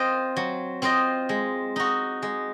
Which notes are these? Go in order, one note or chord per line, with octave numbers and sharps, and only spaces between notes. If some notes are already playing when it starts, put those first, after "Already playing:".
Already playing: C4 F4 C5 D#5
F#3
C4 F4 C5 D#5
G#3
D#4 F#4
G#3